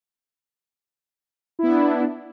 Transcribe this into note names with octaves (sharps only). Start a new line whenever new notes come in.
B3 D4 E4